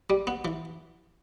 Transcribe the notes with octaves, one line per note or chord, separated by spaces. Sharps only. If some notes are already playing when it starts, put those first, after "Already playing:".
G3
B3
E3